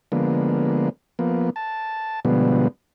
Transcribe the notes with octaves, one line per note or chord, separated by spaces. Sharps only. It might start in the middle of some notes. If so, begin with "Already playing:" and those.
D3 F3 G#3 A#3 B3
F3 A#3 B3
A5
B2 D3 F3 G3 G#3 B3